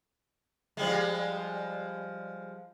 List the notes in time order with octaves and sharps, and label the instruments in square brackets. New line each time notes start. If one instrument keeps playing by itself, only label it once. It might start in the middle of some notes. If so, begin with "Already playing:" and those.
[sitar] F3 G3 G#3